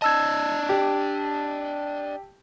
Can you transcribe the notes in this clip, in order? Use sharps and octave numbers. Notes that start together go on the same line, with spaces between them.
D4 D#5 A5 E6 G#6
G4